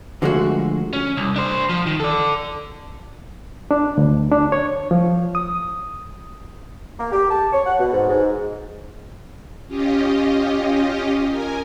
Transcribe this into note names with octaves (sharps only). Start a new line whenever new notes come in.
D3 F3 G#3 A3 F#4
C#4
C2
D4 C5
F3
D#3
A4 D5
D4
D2
D4
C#5
F3
D#6
A#3
G4
A5
C#5
F#5
B2
G#2
G#2
C#4 F4 G4 D#5
A#4 G#5